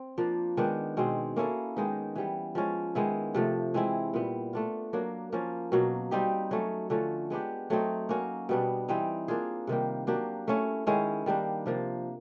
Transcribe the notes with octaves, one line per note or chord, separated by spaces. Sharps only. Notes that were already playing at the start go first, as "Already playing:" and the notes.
Already playing: C4
F3 A#3 D4
D#3 G#3 B3 D4
B2 G#3 C4
A#3 C#4 E4 A4
D#3 G#3 B3 D#4
E3 G3 B3
F3 G#3 C#4
D#3 G#3 B3 E4
C3 F3 A3
E3 G#3 C4 E4
A#2 G3 B3
A3 D4 F4
F#3 A#3 D4
F3 A#3 C#4
B2 F#3 A#3
G3 C4 D#4 G4
F#3 A3 C#4
D3 F3 A3 C#4
G#3 B3 D4 G4
F#3 A3 C4 D#4
A#3 C#4 F#4
B2 G3 B3 D4
E3 G3 C4 D#4
A#3 D4 F4 G#4
C3 D#3 G3 A#3
F#3 A#3 D4 G4
A3 C#4 E4
D#3 G#3 C#4 E4
D#3 G3 A#3 D4
C3 F3 A#3